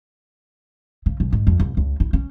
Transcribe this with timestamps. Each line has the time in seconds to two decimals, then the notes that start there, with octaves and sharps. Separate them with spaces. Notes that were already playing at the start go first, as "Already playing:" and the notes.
1.06 C#3
1.20 B1
1.33 G#2
1.47 F2
1.60 C2
1.77 C#2
2.00 E4
2.13 C#4